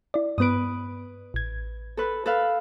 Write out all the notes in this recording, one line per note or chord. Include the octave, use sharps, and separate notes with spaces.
E4 D5
G2 B3 B4 D#6 D7
A1 G#6
A4 B4
A4 B4 F5